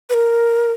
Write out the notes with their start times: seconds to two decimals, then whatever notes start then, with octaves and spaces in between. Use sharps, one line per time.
0.10 B4
0.14 A#4